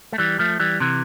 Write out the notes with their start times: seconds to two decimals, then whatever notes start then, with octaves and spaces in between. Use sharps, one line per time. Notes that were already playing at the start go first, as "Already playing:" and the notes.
0.13 A3
0.18 E3 G3
0.39 F3 A3
0.60 E3 G3
0.80 C3 E3